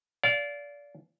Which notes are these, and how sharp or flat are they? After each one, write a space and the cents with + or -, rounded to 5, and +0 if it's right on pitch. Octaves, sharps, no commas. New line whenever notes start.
D5 -25 F5 +0